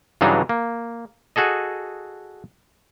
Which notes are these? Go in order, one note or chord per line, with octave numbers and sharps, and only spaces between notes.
G2 C#3 E3 F#3 D4 D#4
A#3
F#4 G#4 A4 D#5